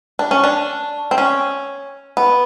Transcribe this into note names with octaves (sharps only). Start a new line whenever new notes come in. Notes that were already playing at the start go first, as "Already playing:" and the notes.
D4
C#4
D4
C4
C#4
B3